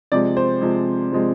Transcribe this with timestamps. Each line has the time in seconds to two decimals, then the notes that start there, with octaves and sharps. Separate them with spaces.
0.12 C3 F3 G#3 D5
0.37 C5
0.61 C3 F3 G#3
1.12 C3 F3 G#3